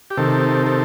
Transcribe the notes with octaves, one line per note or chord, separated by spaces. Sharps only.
G4
C3 D#3 A4
A4